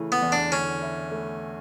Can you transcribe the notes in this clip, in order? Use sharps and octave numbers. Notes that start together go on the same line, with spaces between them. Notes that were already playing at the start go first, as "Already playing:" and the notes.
Already playing: C#3 E3 A3
B3
E2
D4
D3 C#4
E4
A3